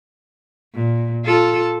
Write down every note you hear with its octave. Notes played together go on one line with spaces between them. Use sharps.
A#2
F4 A4